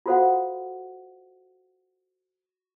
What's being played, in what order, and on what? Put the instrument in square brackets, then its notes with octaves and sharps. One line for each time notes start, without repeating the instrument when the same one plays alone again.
[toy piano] F4 F#4 A4 C5 F5 F#5